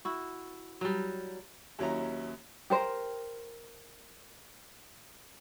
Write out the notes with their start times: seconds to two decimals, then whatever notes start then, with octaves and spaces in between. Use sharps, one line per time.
0.05 E4 F#4
0.81 F#3 G3
1.79 D#2 F#3 C#4 E4 A#5
2.70 G4 A#4 C5